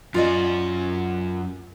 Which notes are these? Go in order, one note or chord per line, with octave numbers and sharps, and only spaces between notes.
F#2 C#4 F4 D5 D#5